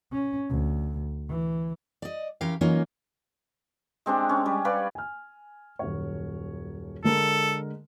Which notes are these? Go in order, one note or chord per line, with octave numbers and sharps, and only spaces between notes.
C#4
D2
E3
D5 D#5
E3 C#4 G4 A#4 F5
E3 F#3 A#3 C#4 D#4 F4
G#3 C4 D4 G4
C#4
G3
B4 C#5 D5 F5
G#5 F6
D#1 F#2 C#5
D3 G#3 A4 A#4